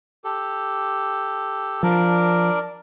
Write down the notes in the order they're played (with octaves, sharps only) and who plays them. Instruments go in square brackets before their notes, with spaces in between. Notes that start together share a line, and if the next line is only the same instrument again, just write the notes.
[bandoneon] G4 A4
[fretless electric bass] F3 [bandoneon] D4 A#4 D5